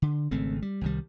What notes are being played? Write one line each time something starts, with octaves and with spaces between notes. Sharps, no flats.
D3
G#1 C#3 A3 C4
G3
C2 D#3 G3